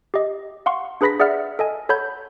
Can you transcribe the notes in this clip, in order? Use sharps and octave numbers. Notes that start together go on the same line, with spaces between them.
G4 D#5
F5 F#5 C6 C#6
D4 G#4 B4 B5 A#6 B6
G#4 D5 E5 F#5 F6
A4 D#5 G#5
A4 C#5 F#5 B5 G6